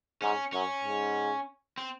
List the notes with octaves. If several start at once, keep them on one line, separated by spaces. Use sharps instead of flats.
G#2 C#4
F#2 C#4
G#2
C4